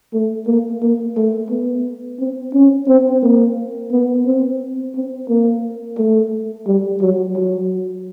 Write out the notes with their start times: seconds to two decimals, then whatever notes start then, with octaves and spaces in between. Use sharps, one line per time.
0.14 A3
0.47 A#3
0.82 A#3
1.17 A3
1.50 B3
2.20 C4
2.54 C#4
2.88 C4
3.23 A#3
3.91 B3
4.26 C4
4.96 C4
5.29 A#3
5.98 A3
6.67 G3
7.01 F#3
7.36 F#3